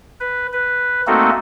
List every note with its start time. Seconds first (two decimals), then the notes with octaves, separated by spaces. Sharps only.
0.20 B4
0.53 B4
1.07 A3 A#3 C4 D#4 F#4 A4